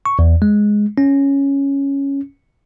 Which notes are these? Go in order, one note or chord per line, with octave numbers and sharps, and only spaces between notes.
C#6
E2
G#3
C#4